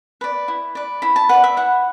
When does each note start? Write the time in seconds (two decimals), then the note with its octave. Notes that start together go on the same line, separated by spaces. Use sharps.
0.21 B4 D5
0.48 E4
0.75 B4 D5
1.02 E4 B5
1.16 A5
1.29 B4 D5 F#5
1.44 E5
1.57 E4 F#5